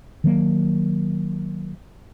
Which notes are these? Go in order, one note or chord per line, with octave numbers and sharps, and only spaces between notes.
D#3 F#3 A#3